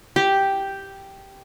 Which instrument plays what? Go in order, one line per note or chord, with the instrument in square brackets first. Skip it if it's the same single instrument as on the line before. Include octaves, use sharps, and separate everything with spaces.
[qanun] G4